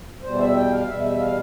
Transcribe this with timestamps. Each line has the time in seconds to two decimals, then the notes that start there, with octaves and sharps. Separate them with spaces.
0.22 E2 B2 G3 C5
0.38 E5
0.55 G5
0.71 F5
0.87 E2 B2 G3 E5
1.04 E5
1.20 F5